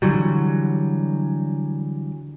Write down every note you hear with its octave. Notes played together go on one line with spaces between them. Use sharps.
D3 E3 F#3 G3